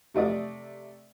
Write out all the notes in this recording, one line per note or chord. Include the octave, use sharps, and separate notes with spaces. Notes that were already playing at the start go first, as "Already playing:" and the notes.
C3 A3 D5 D#6